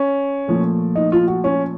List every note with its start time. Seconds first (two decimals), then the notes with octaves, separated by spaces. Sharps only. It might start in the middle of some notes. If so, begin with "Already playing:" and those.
Already playing: C#4
0.48 A#2 F3 A3
0.95 D#4
1.12 F4
1.27 F#4
1.44 C#4